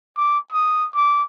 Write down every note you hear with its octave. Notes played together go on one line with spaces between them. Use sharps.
D6
D#6
D6